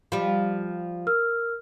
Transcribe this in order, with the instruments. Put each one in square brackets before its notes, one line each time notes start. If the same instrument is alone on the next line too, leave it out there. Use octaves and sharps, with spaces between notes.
[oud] F3 G3
[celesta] A#4 E6 F6